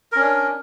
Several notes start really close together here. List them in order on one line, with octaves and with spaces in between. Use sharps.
A#4 C#4 D4